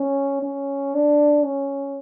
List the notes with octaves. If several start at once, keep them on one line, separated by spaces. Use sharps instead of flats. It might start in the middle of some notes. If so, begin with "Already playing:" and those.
Already playing: C#4
C#4
D4
C#4